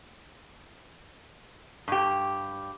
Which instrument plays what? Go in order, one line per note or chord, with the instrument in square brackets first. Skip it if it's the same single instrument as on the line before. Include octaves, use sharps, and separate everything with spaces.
[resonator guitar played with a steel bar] G2 G4